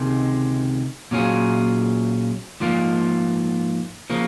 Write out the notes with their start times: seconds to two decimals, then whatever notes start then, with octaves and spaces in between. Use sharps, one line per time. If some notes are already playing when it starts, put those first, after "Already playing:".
Already playing: C#2 C3 D#3 G#3
1.11 A#2 F#3 C#4 F4 G#4
2.60 G#2 F3 A#3 F4
4.10 C#3 F3 A#3